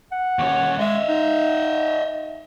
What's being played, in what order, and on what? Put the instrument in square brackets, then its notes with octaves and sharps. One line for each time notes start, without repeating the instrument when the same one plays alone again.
[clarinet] F#5
[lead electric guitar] D#2 C#4
[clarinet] G#3 [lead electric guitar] D#5 E5
[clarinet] D#4